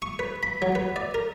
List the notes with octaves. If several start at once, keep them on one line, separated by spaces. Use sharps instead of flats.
C#6
B4
B5
F#3
B4
D5
A#4